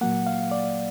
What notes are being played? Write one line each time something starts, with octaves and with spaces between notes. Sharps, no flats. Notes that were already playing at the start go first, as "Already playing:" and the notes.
A#2 F#3 A#3 F#5
F5
D5